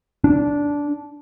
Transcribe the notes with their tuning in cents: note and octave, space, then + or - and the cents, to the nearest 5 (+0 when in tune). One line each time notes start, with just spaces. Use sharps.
D4 -15